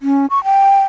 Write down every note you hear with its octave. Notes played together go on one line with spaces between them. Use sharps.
C#4
C#6
G5